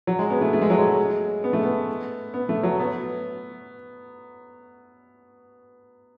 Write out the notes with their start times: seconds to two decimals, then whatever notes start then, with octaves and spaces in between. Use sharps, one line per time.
0.07 F#3
0.19 G#3
0.30 B3
0.41 A3
0.53 A3
0.62 G#3
0.70 F#3
0.78 G#3
1.44 B3
1.53 A3
1.63 B3
2.34 B3
2.49 A3
2.63 F#3
2.79 B3